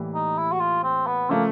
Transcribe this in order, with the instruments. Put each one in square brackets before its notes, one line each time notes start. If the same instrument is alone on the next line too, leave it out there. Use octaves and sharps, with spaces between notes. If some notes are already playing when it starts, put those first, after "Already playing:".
Already playing: [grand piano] A2 E3 G3 A#3
[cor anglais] D#4
E4
F#4
F4
C4
B3
[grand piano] C#3 F3 A3 [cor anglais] A#3